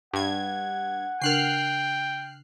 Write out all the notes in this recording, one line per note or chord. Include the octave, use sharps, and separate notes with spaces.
G2 F#5 G#6
C#3 D4 A#4 G5 F6 F#6 C7